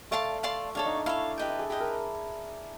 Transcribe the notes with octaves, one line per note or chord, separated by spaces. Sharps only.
A3 D5 F5 A5 C6
D5 F5 A5 C6
D4 A4 C#5 F5
D#4
D4
E4 A4 C#5 F5
G4 B4 D#5 G5
E4
G#4
G4 G#4 B4 D#5 G5
A#4